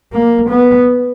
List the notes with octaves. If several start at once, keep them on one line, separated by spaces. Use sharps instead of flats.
A#3
B3